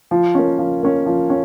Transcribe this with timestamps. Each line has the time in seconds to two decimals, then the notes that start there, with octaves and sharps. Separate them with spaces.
0.11 F3
0.35 A#3 C#4
0.59 F3
0.83 A#3 C#4
1.06 F3
1.30 C#4